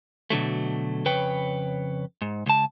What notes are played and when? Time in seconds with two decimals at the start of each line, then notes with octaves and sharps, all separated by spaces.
0.30 B2 D3 F#3 A3
1.05 F2 C#3 B4 C#5 G5
2.22 G#2
2.46 C#2 A5